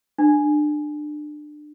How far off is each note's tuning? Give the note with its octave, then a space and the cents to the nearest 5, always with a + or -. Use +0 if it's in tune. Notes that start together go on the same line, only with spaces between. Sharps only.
D4 +25